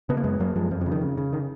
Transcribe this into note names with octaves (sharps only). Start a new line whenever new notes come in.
C#3 B3
A#3
F#2 G#3 B3
F#2 F#3 A#3
F#2 F3 G#3
F2 F3
C#3 F3
D#3
C#3
C#3
D#3